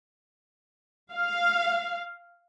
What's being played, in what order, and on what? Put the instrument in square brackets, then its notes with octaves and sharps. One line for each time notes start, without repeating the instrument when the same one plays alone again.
[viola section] F5